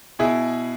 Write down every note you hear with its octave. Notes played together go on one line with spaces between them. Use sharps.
B2 E4 G#4